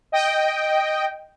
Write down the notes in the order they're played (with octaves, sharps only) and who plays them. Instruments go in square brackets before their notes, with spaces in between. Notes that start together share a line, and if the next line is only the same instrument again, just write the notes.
[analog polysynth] D#5 G5